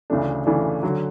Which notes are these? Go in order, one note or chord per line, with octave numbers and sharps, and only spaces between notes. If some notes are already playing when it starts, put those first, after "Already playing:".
D2 C#3 E3 A3 D4
D2 C#3 E3 A3 D4
D3 F#3